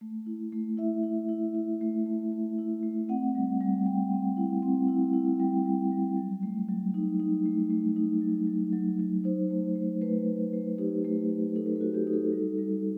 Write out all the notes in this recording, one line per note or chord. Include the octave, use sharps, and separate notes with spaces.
A3
E4
A3
E4 E5
E4
E4
E4
A3
A3
A3
E4
A3
C4 F#5
G3
G3
G3 G5
C4
E4
C4
E4
E4
G3 G5
G3
G3
F#3
A3
F#3
D#4
D#4
A3
A3
D#4
F#3
F#3
F#3
F#3
D#4 C5
A3
A3
A3 B4
A3
A3
D#4 G4
A3
D#4
D#4 A4
B4
A4
F#4
G4
D#4
A4
G3
G3